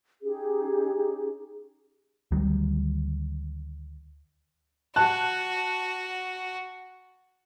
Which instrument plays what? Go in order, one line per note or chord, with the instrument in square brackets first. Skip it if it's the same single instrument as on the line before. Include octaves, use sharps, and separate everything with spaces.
[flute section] C#4 D#4 G4 G#4
[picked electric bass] D2 D#3 F#3 G3
[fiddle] F#4 [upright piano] A5 F#6